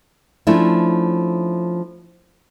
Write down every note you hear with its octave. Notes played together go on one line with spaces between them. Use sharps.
F3 A3 C#4 D4 E4